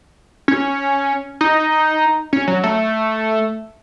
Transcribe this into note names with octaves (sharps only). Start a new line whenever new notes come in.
C#4
D#4
C#4
F#3
A3